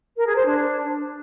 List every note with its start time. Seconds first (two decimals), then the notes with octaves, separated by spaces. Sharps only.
0.16 A#4
0.26 G#4
0.36 C5
0.45 D4